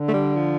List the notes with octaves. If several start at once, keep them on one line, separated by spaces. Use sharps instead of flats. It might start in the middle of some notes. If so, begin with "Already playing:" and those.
Already playing: D3
A3
G3
F3